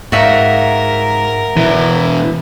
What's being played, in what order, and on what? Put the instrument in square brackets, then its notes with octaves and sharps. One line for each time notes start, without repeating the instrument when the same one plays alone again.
[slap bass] G#2 [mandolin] F#4 E5 F5 [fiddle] A#4
[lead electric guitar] B2 E4 [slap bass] E3